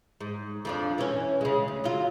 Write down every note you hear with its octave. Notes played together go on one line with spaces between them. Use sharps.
G#2
F2 F3 D4
E3 C#4
C#3 G#3
D2
F#3 F4